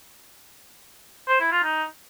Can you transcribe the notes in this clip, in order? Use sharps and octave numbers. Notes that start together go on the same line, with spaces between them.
C5
E4
F4
D#4